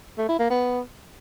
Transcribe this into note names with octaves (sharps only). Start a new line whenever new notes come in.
A3
E4
A#3
B3